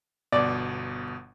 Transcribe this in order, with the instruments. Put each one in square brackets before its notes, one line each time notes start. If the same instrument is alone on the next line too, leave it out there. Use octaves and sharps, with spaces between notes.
[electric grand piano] G1 B2 [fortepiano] D5